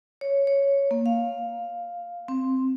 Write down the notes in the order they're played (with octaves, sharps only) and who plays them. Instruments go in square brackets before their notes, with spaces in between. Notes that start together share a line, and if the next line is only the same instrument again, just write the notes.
[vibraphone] C#5
C#5
A#3
F5
C4